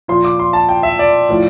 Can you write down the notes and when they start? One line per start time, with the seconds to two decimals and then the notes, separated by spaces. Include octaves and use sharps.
0.08 A#2 F3 C6
0.25 D6
0.39 C6
0.53 A5
0.69 G5
0.83 E5
0.99 D5
1.29 A2 F3